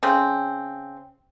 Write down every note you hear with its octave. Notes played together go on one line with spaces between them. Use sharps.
C#3 C4